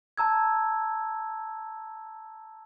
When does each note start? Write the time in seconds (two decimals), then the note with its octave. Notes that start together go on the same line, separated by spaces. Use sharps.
0.18 A5 A#5 E6 G#6